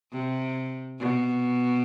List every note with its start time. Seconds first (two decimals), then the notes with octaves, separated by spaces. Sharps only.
0.12 C3
0.99 B2